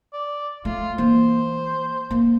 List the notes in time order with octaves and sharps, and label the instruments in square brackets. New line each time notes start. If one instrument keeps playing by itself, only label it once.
[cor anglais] D5
[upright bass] A3 [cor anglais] F4
[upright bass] E3 A#3 [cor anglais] C5
[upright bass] A#3